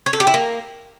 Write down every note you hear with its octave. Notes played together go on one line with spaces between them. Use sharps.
C#5
A4
G4
E4
A#3